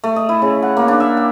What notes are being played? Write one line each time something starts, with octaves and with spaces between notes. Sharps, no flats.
A3
D#5
E4
C#3
F#5
A#3
D4
E5
G5